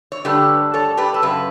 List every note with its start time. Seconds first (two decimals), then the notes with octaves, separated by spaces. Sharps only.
0.12 C#5
0.25 G2 D3 A3 G4 B4
0.74 A4 C#5
0.97 G4 B4
1.14 A4
1.22 F#2 C#3 B4